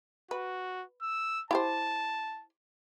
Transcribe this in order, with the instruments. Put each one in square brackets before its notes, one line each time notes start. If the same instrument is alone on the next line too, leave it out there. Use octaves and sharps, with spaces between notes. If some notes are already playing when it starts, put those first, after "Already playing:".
[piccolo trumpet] F#4 [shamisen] B4
[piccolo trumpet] E6
[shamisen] E4 G4 C5 [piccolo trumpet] A5